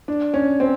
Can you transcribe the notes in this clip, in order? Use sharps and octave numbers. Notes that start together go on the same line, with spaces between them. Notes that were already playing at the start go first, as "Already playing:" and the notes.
D4
C#4
C4